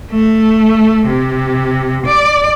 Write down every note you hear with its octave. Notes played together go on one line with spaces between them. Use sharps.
A3
C3
D5